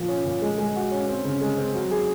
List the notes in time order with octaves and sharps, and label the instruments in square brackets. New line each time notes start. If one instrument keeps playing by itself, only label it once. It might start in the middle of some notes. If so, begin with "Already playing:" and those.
Already playing: [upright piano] A#2 F3
C#4
A#2
G#3
G#3
F#4
C#4
C4
C#3
G#3
C4
F#3
G#4